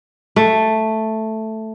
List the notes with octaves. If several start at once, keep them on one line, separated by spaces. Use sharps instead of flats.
A3